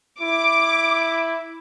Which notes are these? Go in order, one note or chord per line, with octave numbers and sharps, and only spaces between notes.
E4 D6